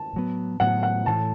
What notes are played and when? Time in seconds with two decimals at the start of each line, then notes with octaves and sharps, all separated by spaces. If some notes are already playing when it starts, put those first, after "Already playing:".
Already playing: A5
0.13 A2 F#3 B3
0.60 A2 F#3 B3 F#5
0.83 F#5
1.06 A2 E3 A3 A5